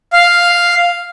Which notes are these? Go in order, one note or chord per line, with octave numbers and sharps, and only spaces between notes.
F5